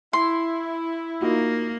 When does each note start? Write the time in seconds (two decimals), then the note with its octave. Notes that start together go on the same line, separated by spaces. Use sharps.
0.13 E4 C6
1.22 A#3 D#4 F4 F#4